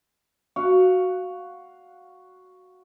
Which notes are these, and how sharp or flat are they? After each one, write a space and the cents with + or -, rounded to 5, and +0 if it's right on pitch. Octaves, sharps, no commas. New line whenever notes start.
F#4 +0 F5 +0